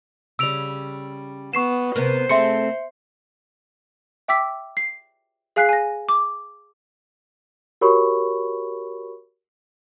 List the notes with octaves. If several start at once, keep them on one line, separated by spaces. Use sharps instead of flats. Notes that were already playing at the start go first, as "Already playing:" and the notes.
C#3 G3 E6 D7 F7
B3 C#6 C7 E7
C3 B3 A#4 C5
A3 C4 G#4 E5 C6 C#7
E5 G5 D6 E6 B6
C7
G#4 F5 G#5 F#6 B6 C7
G#5 A#6
D6
F#4 G4 A#4 C#5 B5 C#6